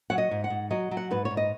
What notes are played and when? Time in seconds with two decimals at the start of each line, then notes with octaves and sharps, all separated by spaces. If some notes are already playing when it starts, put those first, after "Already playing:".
0.10 F#3 F#5
0.18 D#5
0.31 G#2
0.44 F#5
0.50 G#2
0.71 F#3 D#5
0.91 F#3
0.97 F#5
1.11 G#2 B4
1.25 C#5
1.31 G#2
1.37 D#5